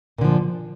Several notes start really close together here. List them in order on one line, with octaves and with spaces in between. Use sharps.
A#2 D3 F3